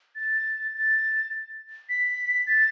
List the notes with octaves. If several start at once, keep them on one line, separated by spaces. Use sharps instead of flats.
A6
A6
B6
A6